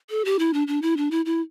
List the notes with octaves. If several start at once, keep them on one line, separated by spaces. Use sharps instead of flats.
A4
G4
E4
D4
D4
E4
D4
E4
E4